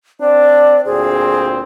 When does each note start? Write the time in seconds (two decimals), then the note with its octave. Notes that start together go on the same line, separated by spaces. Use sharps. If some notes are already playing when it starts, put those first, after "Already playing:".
0.21 C4 D4 D5
0.85 D2 A#2 C4 G#4